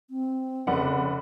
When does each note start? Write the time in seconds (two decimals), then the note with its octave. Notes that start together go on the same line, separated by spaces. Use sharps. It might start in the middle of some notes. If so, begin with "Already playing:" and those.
0.10 C4
0.67 F1 C#3 D5 F#5